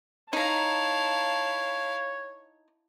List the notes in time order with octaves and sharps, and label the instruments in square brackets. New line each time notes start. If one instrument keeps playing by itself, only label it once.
[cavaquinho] D#4 A#5 [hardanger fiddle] E4 F5 [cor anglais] C#5 [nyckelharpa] A5